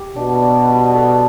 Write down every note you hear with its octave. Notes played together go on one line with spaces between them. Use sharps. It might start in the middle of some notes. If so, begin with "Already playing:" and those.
Already playing: G4
B2 D4
D5
G3
A4